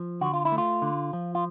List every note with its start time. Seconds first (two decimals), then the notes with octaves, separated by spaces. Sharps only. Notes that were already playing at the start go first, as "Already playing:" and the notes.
Already playing: F3
0.21 D3 F#4
0.34 F4
0.45 E4
0.52 A3
0.58 F4
0.82 D3
1.13 F3
1.35 F4